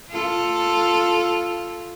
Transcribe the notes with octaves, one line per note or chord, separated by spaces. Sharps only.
F4 A4